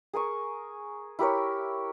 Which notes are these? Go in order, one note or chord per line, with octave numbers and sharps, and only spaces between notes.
G#4 A#4 G#5 C#6
E4 G4 A#4 C#5